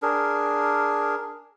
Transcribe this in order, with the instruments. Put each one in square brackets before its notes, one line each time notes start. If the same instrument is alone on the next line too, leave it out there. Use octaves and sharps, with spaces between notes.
[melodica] D4 G#4 A#4